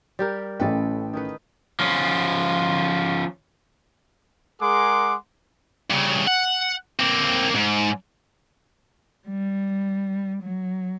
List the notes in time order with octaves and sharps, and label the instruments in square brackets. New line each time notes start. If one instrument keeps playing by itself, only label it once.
[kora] G3 G4 A#4
[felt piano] A1 C#4 G5 [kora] A4 B4
[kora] D#3 D#4 B4
[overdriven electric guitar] F3 C#4
[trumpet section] G#3 G#4 A#4 F#5 C6 D6
[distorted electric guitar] G2 C#3
F#5
A#3 C4
G#2
[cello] G3
F#3